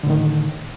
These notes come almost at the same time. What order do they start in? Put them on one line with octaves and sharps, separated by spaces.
D3 A2 D#3